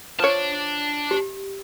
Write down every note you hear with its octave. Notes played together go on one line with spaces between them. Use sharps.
F3 D4 C#5 A5
G4